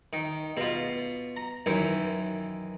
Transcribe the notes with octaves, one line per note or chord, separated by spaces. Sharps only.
D#3
B2 F4
A#5
F#2 D#3 E3